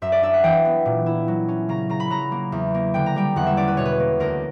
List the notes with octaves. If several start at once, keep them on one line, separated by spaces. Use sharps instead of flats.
F#2 E5
D5
D4 E5
F#5
E3 G5
B3
A#2
E4
F#3
C#4
C#3 A#5
C#3 A#5
B5
F#3 A#5
A#3
E2
A#3
D3 G5
A#5
G3 G5
E2 F#5
E5
C#4 D5
B4
B2 C#5
B4
A#3
D2 A#4